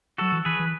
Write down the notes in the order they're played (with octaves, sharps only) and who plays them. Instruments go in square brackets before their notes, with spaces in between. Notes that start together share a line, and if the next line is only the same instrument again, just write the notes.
[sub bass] F#3 [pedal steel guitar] F#4 A4
[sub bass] E3
[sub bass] E3 [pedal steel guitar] G#4 B4
[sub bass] E3